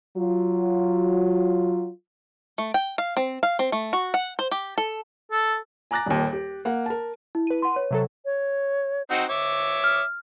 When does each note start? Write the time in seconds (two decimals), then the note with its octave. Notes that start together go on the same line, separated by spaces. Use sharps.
0.17 F#3 F4
2.58 A3
2.74 G5
2.98 F5
3.17 C4
3.43 F5
3.59 C4
3.72 A3
3.93 F#4
4.14 F#5
4.39 C5
4.51 G4
4.78 A4
5.31 A4
5.91 G#5 A#5 D6 F#6 A6 A#6
6.06 D#1 D#2
6.33 G4
6.65 A#3 F#5
6.86 A#4 A5
7.35 E4
7.47 B4 D#7
7.62 F#5 C6
7.76 C#5
7.91 C3 F#3 A4
8.25 C#5
9.10 C4 D#4 F#4
9.29 C#5 E5 D6
9.84 F6